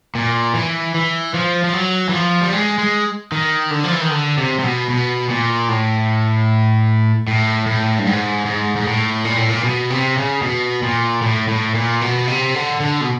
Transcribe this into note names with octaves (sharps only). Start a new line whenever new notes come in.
A#2
E3
E3
F3
F3
F#3
E3
F3
G3
G#3
G#3
D#3
D3
F3
E3
D#3
D3
C3
C3
B2
B2
A#2
A2
A2
A2
G2
G#2
G#2
G#2
A2
A#2
A2
A#2
B2
C3
C#3
B2
A#2
A2
A2
A#2
B2
C3
D3
D3
B2